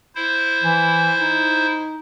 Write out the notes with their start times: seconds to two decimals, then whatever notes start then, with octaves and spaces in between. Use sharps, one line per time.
0.15 E4 C5
0.63 E3
1.18 D#4